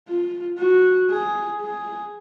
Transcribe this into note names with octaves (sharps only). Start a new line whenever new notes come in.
F4
F#4
G#4
G#4